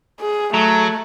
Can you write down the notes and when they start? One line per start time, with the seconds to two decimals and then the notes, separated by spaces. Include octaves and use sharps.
0.21 G#4
0.54 F#3 A3 A#5